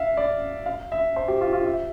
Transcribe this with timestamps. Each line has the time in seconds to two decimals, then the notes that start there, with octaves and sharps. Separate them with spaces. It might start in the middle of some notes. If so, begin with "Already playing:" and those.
Already playing: E5 F5
0.17 D5
0.66 F5
0.92 E5
1.16 C5
1.28 G4
1.41 F4
1.53 F4
1.66 E5